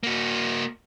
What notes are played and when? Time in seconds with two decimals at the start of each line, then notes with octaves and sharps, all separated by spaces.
0.03 A#3 F#4